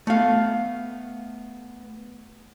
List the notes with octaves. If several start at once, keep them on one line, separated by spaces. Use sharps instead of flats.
A3 B3 F5